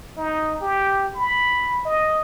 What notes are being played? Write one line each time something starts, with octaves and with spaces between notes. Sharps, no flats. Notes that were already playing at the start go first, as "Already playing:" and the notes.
D#4
G4
B5
D#5